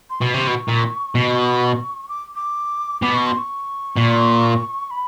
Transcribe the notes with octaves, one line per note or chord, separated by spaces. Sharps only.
C6
B2 C#6
C3
B2
A#2
B2
D6
D6
B2 D6
C#6
C6
C#6
A#2
B5